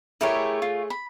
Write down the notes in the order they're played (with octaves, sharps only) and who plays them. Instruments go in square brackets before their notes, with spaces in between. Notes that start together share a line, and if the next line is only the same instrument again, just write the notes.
[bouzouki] A3 G#4 C#5 [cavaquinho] E4 G4 A#4
[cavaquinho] F4
B5